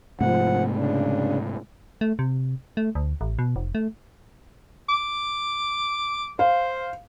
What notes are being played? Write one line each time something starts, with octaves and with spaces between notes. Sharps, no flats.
G#2 C3 F3 A3 F#5
C#3 D4
A3
C3
A3
D2
A1
B2
F1
A3
D6
C5 F5